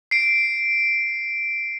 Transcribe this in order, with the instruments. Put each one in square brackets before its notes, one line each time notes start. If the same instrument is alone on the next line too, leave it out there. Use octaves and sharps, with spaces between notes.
[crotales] C7 D7